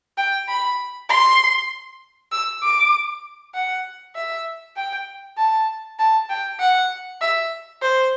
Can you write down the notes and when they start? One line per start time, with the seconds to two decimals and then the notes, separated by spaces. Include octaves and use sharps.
0.18 G5
0.49 B5
1.10 C6
2.32 E6
2.63 D6
3.54 F#5
4.15 E5
4.76 G5
5.38 A5
5.99 A5
6.30 G5
6.60 F#5
7.22 E5
7.83 C5